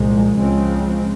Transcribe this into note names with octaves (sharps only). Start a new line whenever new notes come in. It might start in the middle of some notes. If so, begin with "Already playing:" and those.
Already playing: C2 A#2 F3 G#3
C#2 C#3 F3 G#3 C4